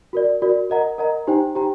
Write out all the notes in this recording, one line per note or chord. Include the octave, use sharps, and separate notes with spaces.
F#4 A#4 D5
F#4 A#4 D5
A#4 D#5 F#5 A#5
A#4 D#5 F#5 A#5
D#4 G4 C5 G5 A#5
D#4 G4 C5 G5 A#5